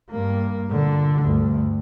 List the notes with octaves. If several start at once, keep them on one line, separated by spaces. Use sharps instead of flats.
G2 A#3
A#2 D3
D2 G2